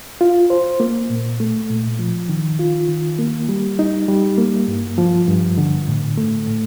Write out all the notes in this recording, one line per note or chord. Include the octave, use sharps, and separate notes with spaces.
F4
C5
A#3
A#2
A3
A#2
F3
D#3
F4
D#3
A#3
G3
D#4
G3
A#3
G2
F3
G2
D3
A2
A3
A2